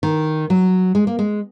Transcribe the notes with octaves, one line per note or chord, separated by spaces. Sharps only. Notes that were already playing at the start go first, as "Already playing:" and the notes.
D#3
F#3
G#3
A#3
G#3